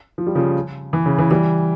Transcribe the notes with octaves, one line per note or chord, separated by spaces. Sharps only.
F3
G3
C#3 F3
E3
C#3
E3
E3 G3